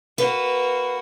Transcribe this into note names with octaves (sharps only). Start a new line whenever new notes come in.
A#3 F#4 B4